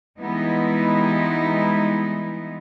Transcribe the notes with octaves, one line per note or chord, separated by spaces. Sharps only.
E3 G3 G#3 B3 D#4 E4